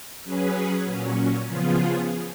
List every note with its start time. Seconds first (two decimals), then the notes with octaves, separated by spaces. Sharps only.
0.24 F#3 C#4 G#4 B4
0.85 A#2 F#3 C#4
1.47 C#3 F3 B3 F4 G#4